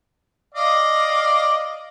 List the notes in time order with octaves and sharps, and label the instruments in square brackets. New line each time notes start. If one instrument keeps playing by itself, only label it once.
[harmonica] D5 D#5 F5